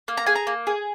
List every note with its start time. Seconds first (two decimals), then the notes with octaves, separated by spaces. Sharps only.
0.08 A#3
0.17 A#5
0.26 G#4 G#5
0.35 A#5
0.47 A#3
0.67 G#4